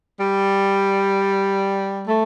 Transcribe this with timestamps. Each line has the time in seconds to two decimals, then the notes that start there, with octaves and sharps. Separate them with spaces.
0.19 G3
2.07 A3